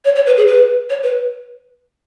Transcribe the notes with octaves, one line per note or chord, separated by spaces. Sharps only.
C#5
C#5
B4
G#4
B4
C#5
B4